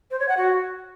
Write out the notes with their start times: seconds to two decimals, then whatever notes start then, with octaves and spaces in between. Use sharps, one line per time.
0.11 C5
0.20 C#5
0.28 F#5
0.37 F#4